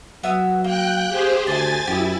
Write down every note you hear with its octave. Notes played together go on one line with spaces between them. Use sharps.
F#3 B3 E5 D#6
A#3 G5 F#6
G4 G#4 C5
D2 E4 C5 G#5 A5 A6
F#2 E4 G4 D#6